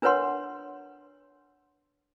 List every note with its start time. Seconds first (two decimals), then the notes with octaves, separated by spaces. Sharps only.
0.02 D4 A#4 B4 C#5 F#5 C6